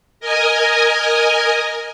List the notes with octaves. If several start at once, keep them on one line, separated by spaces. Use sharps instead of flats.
A#4 D#5 G#5